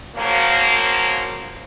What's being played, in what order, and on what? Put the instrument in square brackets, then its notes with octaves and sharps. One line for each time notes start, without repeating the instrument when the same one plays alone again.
[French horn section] C#3 F3 F#3 A#3